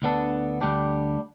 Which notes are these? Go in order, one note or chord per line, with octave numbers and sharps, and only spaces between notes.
D2 D3 B3 D4 A4
D2 D3 G3 D4 G4